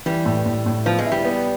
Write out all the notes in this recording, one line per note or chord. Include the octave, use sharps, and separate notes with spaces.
E3 G3
A2
A2
A2
F3 B3
G#3
E4
G3
B3